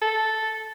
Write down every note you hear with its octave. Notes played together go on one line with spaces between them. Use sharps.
A4